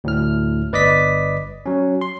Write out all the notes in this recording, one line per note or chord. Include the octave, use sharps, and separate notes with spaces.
D2 A2 F6
G1 B4 D5 D#5 D6 B6
F#3 C#4
C6